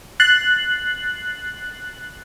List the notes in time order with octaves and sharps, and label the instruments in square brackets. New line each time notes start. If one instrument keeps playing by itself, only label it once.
[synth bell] F#6 A6 C7 F#7